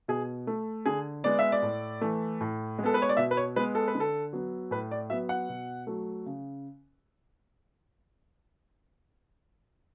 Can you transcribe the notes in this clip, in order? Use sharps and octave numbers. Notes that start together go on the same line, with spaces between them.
B2 G#4
A3
D3 G#4
G#3 B3 D5
E5
D5
A2
E3 A3
A2
G#3
B3 A4
B4
C#5
D5
B2 E5
B4
C#5
G#3 B3 B4
A4
B4
D3
A4
F#3 B3
A2 B4
D5
F#3 B3 E5
F#5
B2
F#3 A3
C#3